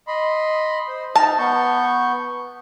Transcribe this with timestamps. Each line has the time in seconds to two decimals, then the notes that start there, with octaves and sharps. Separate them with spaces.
0.08 D#5 B5 C6
0.88 C5
1.16 D#4 D#5 A5 F6
1.38 B3 C#6 G6